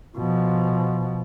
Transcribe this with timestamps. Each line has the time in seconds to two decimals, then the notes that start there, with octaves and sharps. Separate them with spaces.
0.18 B2 F3